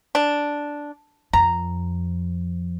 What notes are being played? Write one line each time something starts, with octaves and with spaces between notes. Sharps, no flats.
D4
F2 A#5